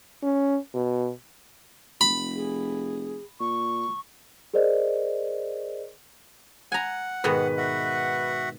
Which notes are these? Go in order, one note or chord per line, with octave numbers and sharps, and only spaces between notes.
C#4
B2
F1 B5
G#4
A#2 C#6
G#4 A#4 C5 D5 D#5
F#5 G#5 A#5
G#2 B2 D#3 B4
F#4 E5 F#5